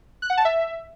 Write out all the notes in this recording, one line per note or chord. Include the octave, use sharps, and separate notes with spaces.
F#6
F#5
A5
E5